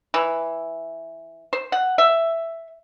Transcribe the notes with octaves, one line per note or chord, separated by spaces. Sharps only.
E3
C5
F#5
E5